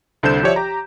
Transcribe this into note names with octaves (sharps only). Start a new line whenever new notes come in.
C2 D3 A4 C5 G6 E7
F3 G4 C#5 D5 E5
G4 A#5